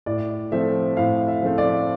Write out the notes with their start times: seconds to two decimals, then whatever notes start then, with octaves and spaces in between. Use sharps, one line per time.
0.06 A2 D5
0.52 F3 A3 C4 E5
0.97 A2 F5
1.28 E5
1.42 F3 A3 C4
1.58 D5